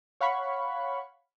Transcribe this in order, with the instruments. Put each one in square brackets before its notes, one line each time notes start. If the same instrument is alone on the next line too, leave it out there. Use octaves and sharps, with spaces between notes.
[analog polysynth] C#5 F5 F#5 B5 C#6